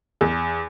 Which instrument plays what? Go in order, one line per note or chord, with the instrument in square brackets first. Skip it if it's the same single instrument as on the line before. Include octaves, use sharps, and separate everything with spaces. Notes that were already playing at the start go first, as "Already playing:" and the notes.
[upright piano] E2